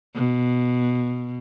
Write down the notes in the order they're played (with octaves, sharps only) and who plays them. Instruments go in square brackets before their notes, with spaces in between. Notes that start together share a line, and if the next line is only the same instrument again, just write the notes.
[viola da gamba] B2